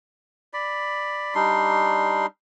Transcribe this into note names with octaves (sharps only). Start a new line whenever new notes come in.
D5 B5
G3 D4 D#4 C6